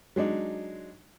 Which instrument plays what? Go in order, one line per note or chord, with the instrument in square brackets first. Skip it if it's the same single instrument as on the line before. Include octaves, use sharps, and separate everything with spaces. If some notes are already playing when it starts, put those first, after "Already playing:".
[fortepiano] F#3 G#3 D4 D#4